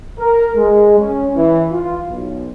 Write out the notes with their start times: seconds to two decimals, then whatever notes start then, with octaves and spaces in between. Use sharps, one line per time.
0.19 A#4
0.56 G#3
0.99 C#4
1.35 E3
1.72 F4
2.07 B1